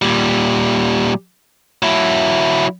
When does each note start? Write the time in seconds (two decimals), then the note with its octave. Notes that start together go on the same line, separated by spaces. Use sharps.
0.02 A#2 G3
1.82 F#3 E4